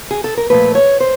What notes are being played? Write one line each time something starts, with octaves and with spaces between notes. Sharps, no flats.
G#4
A4
A#4
A#2 F3 A3 B4
C#5
C5